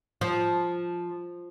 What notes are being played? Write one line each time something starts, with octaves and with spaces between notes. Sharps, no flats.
F3